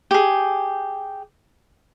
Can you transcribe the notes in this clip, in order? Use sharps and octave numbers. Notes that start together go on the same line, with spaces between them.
G4 G#4